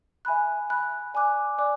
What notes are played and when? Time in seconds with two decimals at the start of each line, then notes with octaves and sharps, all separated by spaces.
0.25 E5 G#5 B5 F#6
0.69 E5 G#5 B5 F#6
1.14 D5 G#5 D6 F#6
1.58 D5 G#5 D6 F#6